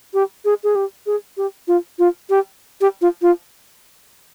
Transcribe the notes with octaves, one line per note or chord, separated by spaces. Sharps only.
G4
G#4
G#4
G4
G#4
G4
F4
F4
G4
G4
F4
F4